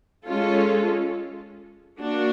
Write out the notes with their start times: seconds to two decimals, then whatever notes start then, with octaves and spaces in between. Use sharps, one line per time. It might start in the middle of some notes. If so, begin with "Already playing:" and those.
0.25 G#3 C#4 F4 A4
2.00 A#3 D4 F#4